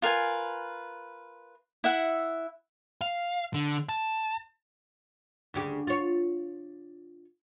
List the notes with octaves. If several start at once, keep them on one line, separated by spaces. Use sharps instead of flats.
F4 A#4 B4 G#5
E4 E5 F#5
F5
D3
A5
D2 C#3 G4
F4 C#5